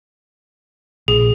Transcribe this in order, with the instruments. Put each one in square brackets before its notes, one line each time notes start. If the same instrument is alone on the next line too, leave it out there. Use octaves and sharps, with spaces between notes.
[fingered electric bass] A#1 [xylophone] G#4